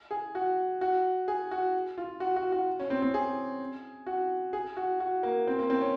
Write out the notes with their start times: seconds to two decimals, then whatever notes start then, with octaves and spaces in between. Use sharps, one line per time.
0.11 G#4
0.35 F#4
0.81 F#4
1.28 G#4
1.51 F#4
1.98 F4
2.20 F#4
2.36 F#4
2.52 F#4
2.80 C#4
2.90 C4
3.02 C4
3.14 G#4
4.07 F#4
4.53 G#4
4.77 F#4
5.00 F#4
5.23 A#3
5.47 C4
5.59 A#3
5.70 C4
5.81 C#4